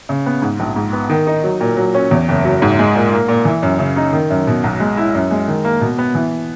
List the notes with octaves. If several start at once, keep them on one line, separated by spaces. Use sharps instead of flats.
C#3
B3
G#2
A#1
G#2
B3
D#3
D#4
F#3
A#2
F#3
C#4
E2
F#1
F#3
G#2
G#3
A#2
A#3
A#2
E3
F#2
C#3
D#4
D#3
F#2
B2
B1
G#3
E4
F#2
G#3
D#3
A#3
B2
B3
E3